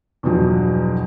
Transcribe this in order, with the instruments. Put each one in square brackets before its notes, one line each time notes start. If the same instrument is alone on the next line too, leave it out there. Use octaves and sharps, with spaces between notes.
[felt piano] E2 G2 B2 F3 F#3